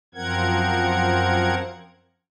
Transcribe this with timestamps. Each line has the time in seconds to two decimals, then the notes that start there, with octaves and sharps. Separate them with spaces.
0.15 F#2 F3 C4 A#4 F#5 G#6